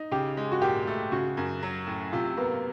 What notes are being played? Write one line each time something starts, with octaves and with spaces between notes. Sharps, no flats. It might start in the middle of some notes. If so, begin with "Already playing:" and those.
Already playing: D#4
C#3 G4
G#3
F#4
A#2 G4
A3
C#3 F#4
F#2
F#3
A2
C3 F4
A#3 B3